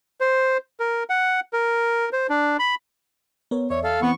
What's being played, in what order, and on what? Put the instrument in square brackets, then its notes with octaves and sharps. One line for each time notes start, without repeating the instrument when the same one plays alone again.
[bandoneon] C5
A#4
F#5
A#4
C5
D4
B5
[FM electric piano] B3 A#4 C#5
[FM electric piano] E2 D5 E5 [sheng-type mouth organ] C#5
[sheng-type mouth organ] A4 F5
[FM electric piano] E3 C4 [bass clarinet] B3 [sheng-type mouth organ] C#6